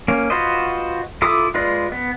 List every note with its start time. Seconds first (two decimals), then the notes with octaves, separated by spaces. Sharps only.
0.08 A#3 C#4
0.30 F4 F#4 B4 C5 D#5
1.22 E4 F4 A4 D6 D#6
1.54 G#3 F4 B4 D5 D#5
1.92 B3